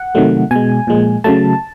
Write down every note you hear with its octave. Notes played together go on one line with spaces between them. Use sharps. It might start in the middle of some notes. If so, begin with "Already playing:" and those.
Already playing: F#5
C3 D#3 F#3 A3
B2 G#3 G#5
A#2 F3 G#3
C#3 F#3 A3 A5